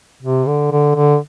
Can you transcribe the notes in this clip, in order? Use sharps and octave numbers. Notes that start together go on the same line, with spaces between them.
C3
D3
D3
D3